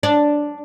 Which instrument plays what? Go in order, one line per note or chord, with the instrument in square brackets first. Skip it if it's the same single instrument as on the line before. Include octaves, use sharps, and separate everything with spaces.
[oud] D4